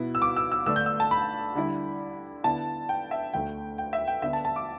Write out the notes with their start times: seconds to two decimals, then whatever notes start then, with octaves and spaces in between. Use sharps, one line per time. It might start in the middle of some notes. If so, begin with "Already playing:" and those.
Already playing: B2 B3 E4
0.15 E6
0.22 D6
0.36 E6
0.52 E6
0.66 D3 A3 D4 E6
0.76 G6
0.86 E6
1.00 A5
1.11 B5
1.55 D3 G3 E4
2.44 D3 B3 E4 A5
2.89 G5
3.11 E5
3.33 D2 D3 A3 G5
3.78 G5
3.93 E5
4.07 G5
4.22 D3 B3 D4 E5
4.33 A5
4.45 A5
4.56 D6